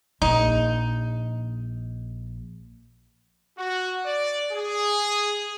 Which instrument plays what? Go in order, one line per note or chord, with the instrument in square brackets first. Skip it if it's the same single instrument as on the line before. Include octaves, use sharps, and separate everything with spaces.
[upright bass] A#1 [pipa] D#4
[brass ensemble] F#4
D5
G#4